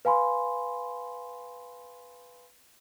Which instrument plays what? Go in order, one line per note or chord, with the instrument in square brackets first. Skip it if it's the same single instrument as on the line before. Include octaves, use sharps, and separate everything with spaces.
[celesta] B4 F5 G#5 B5 C6